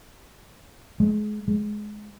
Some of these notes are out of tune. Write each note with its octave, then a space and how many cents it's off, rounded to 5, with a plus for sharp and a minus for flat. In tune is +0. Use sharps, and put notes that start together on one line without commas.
G#3 +30
G#3 +15